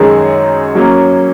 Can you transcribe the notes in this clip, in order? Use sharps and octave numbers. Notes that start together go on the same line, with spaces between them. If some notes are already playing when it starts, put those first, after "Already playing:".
Already playing: F#2 D#3 G#3 D#4 G#4
F#3 A#3 C#4